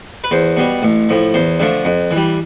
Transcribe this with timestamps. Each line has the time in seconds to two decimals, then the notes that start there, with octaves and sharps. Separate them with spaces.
0.24 B4
0.31 E2 C5
0.57 B2 G3
0.83 A1
1.09 A2 F3
1.34 E2 C5
1.60 D3 F3 A3
1.85 F2
2.11 E3
2.16 G3